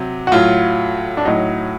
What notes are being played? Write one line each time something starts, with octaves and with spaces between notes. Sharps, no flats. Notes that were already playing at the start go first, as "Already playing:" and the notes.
Already playing: C3 F#3
F#4
A2 F#3 F4
D4
A2 F#3 D#4